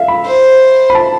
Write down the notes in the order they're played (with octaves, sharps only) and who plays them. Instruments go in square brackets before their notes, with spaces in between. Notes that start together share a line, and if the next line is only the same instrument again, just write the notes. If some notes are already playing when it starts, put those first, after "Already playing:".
Already playing: [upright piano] E5 F5
B5
[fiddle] C5
[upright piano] B5
A5